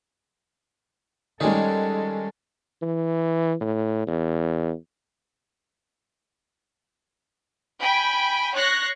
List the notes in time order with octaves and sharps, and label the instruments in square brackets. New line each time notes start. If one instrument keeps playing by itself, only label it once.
[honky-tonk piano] D#3 G#3 [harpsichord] G3 C#4 D#4 [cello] A4
[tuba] E3
A2
E2
[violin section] G5 G#5 B5
C#5 C#6 F#6 A#6 C7